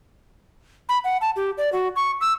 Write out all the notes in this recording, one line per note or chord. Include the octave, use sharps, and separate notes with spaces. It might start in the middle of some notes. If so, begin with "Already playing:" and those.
B5
F#5
A5
G4
D5
F#4
C#6
E6